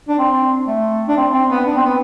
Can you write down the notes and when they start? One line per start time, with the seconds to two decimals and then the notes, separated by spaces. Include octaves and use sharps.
0.08 D4
0.18 C4
0.67 A3
1.08 D4
1.17 C4
1.34 C4
1.51 B3
1.66 D4
1.76 C4
1.85 B3